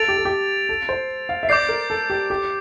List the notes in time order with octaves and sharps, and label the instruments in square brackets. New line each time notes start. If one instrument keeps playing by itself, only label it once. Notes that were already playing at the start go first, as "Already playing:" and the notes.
Already playing: [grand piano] A4 [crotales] A6 D7 F7
[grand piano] G4
A4
G4
A4
C5
F5
E5
[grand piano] D5 [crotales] D6 G6 C7
[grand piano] A#4
A4
G4
G4